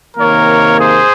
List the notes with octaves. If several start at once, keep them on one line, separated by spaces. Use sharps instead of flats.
C3 D#3 A#3 A#4 C#5
G#4 C5